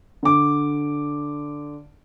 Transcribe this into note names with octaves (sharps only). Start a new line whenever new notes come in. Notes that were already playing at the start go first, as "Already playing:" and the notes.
D3 D6